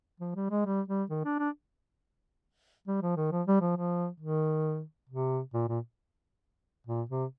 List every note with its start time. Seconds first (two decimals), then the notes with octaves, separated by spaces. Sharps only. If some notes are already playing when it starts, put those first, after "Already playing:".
0.20 F3
0.35 G3
0.50 G#3
0.65 G3
0.88 G3
1.10 D#3
1.25 D4
1.39 D4
2.87 G3
3.02 F3
3.17 D#3
3.32 F3
3.47 G3
3.61 F3
3.76 F3
4.20 D#3
5.09 C3
5.54 A#2
5.68 A#2
6.87 A#2
7.09 C3